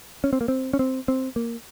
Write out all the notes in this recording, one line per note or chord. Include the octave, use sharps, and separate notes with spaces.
C#4
C4
A#3
C4
C#4
C4
C4
A#3